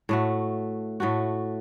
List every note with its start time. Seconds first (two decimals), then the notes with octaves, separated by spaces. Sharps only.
0.09 A2 A3 F#4
1.00 A2 A3 F#4